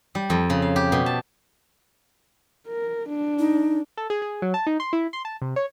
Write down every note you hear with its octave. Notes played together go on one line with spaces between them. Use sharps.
G3
F2
C#3
F5
G4
B2
A5
A#4
D4
D#4
A4
G#4
G#4
F#3
A5
D#4
C6
E4
C6
A5
C3
C#5